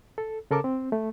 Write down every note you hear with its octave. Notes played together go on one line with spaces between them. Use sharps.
A4
C#3 A4 A#4 A5 D6
C4
A3